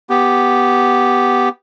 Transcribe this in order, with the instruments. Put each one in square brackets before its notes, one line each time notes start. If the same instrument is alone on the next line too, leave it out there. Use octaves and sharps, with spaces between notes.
[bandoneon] B3 G4